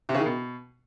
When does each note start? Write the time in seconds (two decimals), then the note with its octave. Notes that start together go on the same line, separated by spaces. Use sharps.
0.09 C3
0.14 C#3
0.20 D#3
0.26 B2